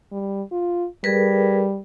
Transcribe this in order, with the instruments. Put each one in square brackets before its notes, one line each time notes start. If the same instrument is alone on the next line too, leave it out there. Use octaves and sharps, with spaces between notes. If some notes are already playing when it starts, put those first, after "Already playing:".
[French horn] G3
F4
[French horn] G3 [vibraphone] G#4 A#4 B4